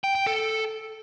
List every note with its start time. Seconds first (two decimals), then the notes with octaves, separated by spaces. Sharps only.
0.04 G5
0.15 G5
0.27 A4